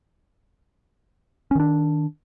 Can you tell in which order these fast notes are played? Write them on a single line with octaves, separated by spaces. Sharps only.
C#4 D#3 D4